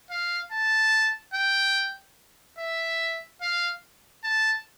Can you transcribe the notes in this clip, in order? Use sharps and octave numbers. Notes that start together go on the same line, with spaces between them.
F5
A5
G5
E5
F5
A5